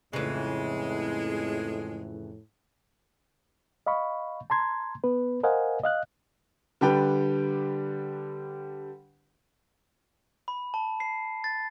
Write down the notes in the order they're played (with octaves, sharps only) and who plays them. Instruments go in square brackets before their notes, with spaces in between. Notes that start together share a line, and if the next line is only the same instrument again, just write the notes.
[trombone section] F2 A2 [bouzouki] C#3 E3 [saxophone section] G#3
[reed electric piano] D#5 F5 B5 C#6
A5 A#5 C6 G#6
B3 B4
A#4 C5 D#5 F5 F#5 G#5
D#5 F5 F#6
[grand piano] D3 G3 D4 G4 B4 G5
[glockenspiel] B5
A5
C7
A6